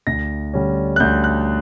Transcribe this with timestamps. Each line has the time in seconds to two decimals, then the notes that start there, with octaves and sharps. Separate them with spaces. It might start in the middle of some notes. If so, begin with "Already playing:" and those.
0.07 D2 A#6
0.54 D3 G3 C#4
0.96 F#6
1.00 D2 G6
1.24 F#6